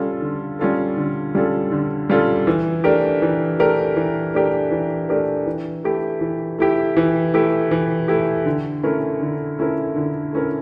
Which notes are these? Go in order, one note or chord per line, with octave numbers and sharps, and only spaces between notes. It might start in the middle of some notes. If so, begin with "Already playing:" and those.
Already playing: G3 C#4 F4 A4
D3
G3 C#4 F4 A4
D3
G3 C#4 F4 A4
D3
G3 C#4 F4 A4
E3
A3 D4 G4 A#4
E3
A3 D4 G4 A#4
E3
A3 D4 G4 A#4
E3
A3 D4 G4 A#4
E3
A3 E4 G4
E3
A3 E4 G4
E3
A3 E4 G4
E3
A3 E4 G4
D3
A3 C#4 E4 A#4
D3
A3 C#4 E4 A#4
D3
A3 C#4 E4 A#4